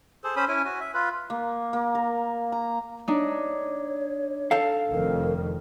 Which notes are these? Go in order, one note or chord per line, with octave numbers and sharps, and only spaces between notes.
G#4 A4 C5
C#4 C5 B5 D#6
C#4 E4 G#5
F#4 G#5
E5
F4 B4
A#3
A#3
A#4
A#5
D4 D#4 C#5
A4 F5
F1 F2 D#3 A#4